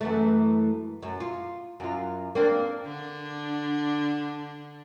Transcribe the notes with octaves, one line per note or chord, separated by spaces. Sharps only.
F#2 E3 A3
F#2
F4
F#2 F4
A#3 C4 D4
D3 D4